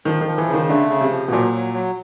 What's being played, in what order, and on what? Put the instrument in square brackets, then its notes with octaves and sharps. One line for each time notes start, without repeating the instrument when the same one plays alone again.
[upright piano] D#3 [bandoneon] F3
[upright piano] D#3
[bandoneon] F3
[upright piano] E3
[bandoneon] C#3
[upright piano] D#3
[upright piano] D3 [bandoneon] A3
[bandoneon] C#3
[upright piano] C3
[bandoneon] F3
[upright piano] B2
[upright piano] A#2 [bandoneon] F#3
[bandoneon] F#3
F#3